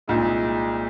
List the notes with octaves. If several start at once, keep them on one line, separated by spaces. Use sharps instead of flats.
C2 A#2 G#3 D#4